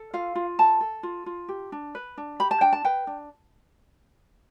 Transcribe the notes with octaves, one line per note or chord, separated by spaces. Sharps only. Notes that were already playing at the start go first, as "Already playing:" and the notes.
Already playing: A4
F4 F5
F4
A4 A5
A4
F4
F4
G4
D4
B4
D4
G4 B5
A5
D4 G5
A5
B4 G5
D4